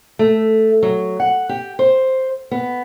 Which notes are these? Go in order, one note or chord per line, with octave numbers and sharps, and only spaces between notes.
A3
F#3
F#5
G4
C5
B3